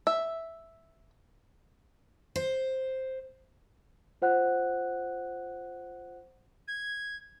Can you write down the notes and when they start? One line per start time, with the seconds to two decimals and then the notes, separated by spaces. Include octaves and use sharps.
0.07 E5
2.36 C5
4.22 F4 C5 F#5 F#6
6.68 G#6